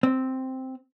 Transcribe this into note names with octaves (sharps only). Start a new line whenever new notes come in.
C4